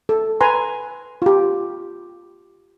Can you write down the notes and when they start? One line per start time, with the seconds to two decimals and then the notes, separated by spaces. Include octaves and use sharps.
0.09 A4
0.41 B4 G#5 A#5 C6
1.22 F4 G4